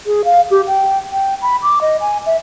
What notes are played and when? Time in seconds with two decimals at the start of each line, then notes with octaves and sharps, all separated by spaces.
0.06 G#4
0.25 F5
0.51 G4
0.67 G5
1.12 G5
1.42 B5
1.63 D6
1.81 D#5
2.01 G#5
2.26 E5